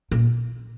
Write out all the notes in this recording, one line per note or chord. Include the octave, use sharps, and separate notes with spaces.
A#2